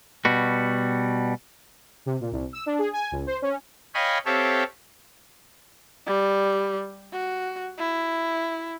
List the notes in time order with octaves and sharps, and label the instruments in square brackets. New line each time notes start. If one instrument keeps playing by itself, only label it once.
[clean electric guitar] B2 G3 F#4
[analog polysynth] C3
A#2
C2
E6
D4
G#4
G#5
C#2
C5
C#4
[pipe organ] C#5 D#5 F5 G5 G#5 B5
C4 G4 A4 C#5 E5 F5
[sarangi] G3
F#4
E4